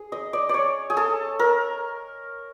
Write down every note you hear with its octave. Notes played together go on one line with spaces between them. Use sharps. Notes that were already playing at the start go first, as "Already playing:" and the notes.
Already playing: G#4
D#5
D5
C#5 D5
G#4
A4
A#4